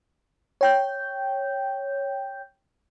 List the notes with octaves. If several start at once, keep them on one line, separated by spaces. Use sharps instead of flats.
C#5 G5 G6